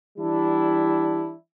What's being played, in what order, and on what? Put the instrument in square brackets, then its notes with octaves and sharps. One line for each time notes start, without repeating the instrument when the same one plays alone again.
[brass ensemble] E3 G3 D4 E4